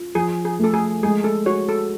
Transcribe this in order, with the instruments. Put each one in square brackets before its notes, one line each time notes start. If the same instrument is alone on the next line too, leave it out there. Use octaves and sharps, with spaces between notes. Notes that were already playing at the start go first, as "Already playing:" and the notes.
Already playing: [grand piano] F4
[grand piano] F3 [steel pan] G#4
[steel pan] G#4
[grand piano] A3 [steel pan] A4
[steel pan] G#4
[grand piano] G#3 [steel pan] G#4
[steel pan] A4
[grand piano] F#4 [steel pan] C#5
[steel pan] A4